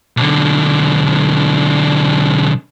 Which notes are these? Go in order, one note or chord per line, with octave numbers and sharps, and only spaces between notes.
B1 D3